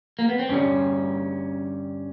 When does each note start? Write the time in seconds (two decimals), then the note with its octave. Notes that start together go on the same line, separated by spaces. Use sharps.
0.19 A#3
0.29 B3
0.39 C4
0.49 G2 D3 G3 C#4